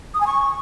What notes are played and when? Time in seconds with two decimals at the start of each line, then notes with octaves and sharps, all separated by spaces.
0.14 D#6
0.20 G#5
0.27 C#6